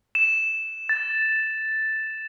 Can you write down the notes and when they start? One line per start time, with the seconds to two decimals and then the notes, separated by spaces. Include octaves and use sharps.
0.15 E7
0.89 A6